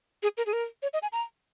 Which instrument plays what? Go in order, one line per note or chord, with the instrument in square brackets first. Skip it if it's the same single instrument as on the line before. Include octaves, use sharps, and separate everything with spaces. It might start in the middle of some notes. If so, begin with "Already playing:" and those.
[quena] G#4
A#4
G#4
A#4
C#5
D#5
G#5
A#5